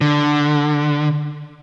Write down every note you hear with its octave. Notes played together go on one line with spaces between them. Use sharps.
D3